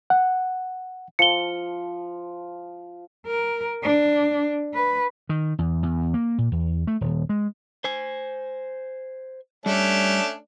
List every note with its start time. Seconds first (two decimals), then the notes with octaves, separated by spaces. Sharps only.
0.10 F#5
1.19 F3 C#7 G7
3.26 A#4
3.83 D4
4.74 B4
5.29 D#3
5.59 E2
5.83 E2
6.14 A#3
6.38 A#2
6.52 E2
6.87 A3
7.01 D#1
7.29 G#3
7.84 C5 G#5
9.66 G3 A3 C#4 D4